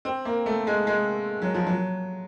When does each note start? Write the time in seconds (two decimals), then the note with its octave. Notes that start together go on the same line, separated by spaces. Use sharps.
0.05 C4
0.25 A#3
0.46 A3
0.67 G#3
0.87 G#3
1.42 F#3
1.54 F3
1.67 F#3